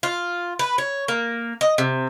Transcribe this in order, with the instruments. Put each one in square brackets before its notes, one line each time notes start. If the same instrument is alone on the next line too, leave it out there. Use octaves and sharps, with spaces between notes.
[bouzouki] F4
B4
C#5
A#3
D#5
C3